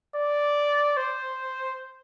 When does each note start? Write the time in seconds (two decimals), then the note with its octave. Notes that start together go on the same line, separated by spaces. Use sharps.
0.16 D5
0.97 C5